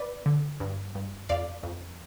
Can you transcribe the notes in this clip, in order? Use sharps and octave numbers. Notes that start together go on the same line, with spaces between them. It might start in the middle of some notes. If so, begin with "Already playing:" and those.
Already playing: B4 D5
D3
G2
G2
F2 D5 F5
F2